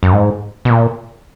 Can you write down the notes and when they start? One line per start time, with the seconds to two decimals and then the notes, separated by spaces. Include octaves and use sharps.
0.03 F#2
0.13 G#2
0.65 B2
0.70 A#2